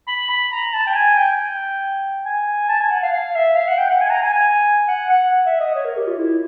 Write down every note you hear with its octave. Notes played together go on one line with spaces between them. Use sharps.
B5
B5
A#5
A5
G5
G#5
G5
G#5
A5
G#5
F#5
F5
F5
E5
F5
F#5
G5
F#5
G#5
A#5
G#5
G#5
F#5
F#5
E5
D#5
C#5
A#4
G4
F4
E4